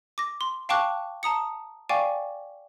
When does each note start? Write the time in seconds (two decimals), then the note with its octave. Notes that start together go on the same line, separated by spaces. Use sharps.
0.18 D6 A#6
0.41 C6
0.69 F5 G5 A5 C#6 D6 F#6
1.23 A5 A#5 D#6 C#7
1.89 D5 F5 G5 G#5 C#6 D6